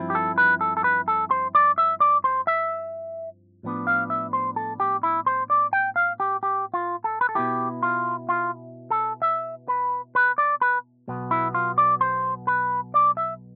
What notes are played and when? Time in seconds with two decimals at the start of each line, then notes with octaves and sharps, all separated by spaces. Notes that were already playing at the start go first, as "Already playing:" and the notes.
Already playing: G2 F3 C4 E4
0.10 G4
0.15 A4
0.38 B4
0.61 A4
0.77 A4
0.84 B4
1.08 A4
1.31 C5
1.55 D5
1.78 E5
2.00 D5
2.24 C5
2.47 E5
3.63 A2 F3 B3 D4
3.87 F5
4.10 E5
4.33 C5
4.56 A4
4.80 G4
5.03 E4
5.26 C5
5.50 D5
5.73 G5
5.96 F5
6.20 G4
6.43 G4
6.74 F4
7.04 A4
7.21 B4
7.29 A4
7.35 B2 B3 E4 G4
7.83 F4
8.29 F4
8.91 A4
9.22 E5
9.68 B4
10.15 B4
10.38 D5
10.61 B4
11.08 B1 B2 B3
11.31 E4
11.54 F4
11.78 D5
12.01 C5
12.47 B4
12.94 D5
13.17 E5